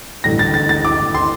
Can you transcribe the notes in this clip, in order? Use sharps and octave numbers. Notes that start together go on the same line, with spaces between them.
A1 G2 D3 A#6
A6
A6
A6
D6
C6